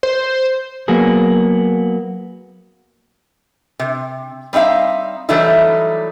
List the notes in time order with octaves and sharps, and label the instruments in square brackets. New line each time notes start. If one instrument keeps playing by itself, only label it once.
[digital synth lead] C5
[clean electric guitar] F#3 A#3 B3 G#4
[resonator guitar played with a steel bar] C3
G3 C4 D#4 E5 F5
E3 F#3 G3 A3 D#4 E4